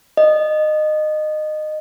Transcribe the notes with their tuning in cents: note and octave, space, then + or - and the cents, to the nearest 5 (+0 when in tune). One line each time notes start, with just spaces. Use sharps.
D#5 -20